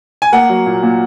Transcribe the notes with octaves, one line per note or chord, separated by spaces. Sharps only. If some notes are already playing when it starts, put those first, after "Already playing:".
G#5
A#3 F#5
F#3
A#2
A#2